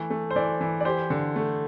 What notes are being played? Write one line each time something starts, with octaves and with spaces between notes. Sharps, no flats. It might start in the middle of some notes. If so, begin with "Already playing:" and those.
Already playing: E3 A3
A3
C5
E3 D5
E3
D5
G4 C5
D3
A3